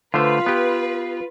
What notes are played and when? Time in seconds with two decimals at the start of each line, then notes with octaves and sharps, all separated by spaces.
0.14 D3 A3 F4 B4 C5
0.46 B3 G4